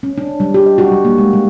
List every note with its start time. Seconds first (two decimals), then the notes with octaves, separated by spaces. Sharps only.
0.03 C#4
0.18 D4
0.40 G3
0.54 G4
0.66 D#5
0.78 F#4
0.92 G3
1.05 A#3
1.18 G#3
1.33 G3